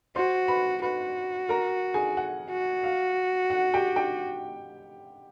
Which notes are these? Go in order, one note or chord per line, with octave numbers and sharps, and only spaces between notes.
F#4 C5 C6
B4 B5
F#4 B4 B5
A#4 A#5
G#4 G#5
F#5
F#4
F5
F#5
G4 G5
G4 G5